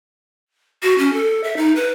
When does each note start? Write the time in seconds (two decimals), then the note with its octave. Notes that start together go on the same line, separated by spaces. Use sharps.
0.83 F#4
0.99 C#4
1.13 A4
1.44 E5
1.57 D#4
1.76 B4